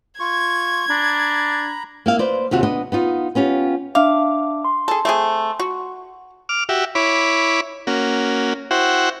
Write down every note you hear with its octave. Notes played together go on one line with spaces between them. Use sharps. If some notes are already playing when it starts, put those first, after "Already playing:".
F4 C#6 G#6
D4 A#5 B5
A#3 E4 F5
B4 C5 D5
D#2 C3 F4 F#4
B3 D4 D#5
B3 D#4 F4
B3 C#4 F4 G4
D4 E5 F5 D6
C6
G#4 A4
A3 C4 G#4
F#4
D6 F6
F#4 G4 E5
E4 C#5 B5 D6
A#3 C#4 F#4
E4 F#4 C5 F#5 G5 C#6